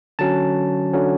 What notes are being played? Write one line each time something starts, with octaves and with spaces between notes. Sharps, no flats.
D3 F#3 C#4 A5
D3 F#3 C#4